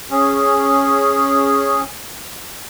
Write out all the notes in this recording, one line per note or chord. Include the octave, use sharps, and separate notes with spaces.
C#4 G#4